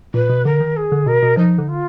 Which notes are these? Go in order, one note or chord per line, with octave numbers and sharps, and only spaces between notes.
A#2 B4
B2
D3 A#4
D#3
G#4
D3
B2 A#4
B2
F3 D#4
D3
F4